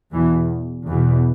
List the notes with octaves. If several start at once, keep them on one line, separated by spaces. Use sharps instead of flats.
E2 B2 E3
E2 B2